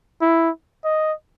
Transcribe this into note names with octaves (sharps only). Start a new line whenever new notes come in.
E4
D#5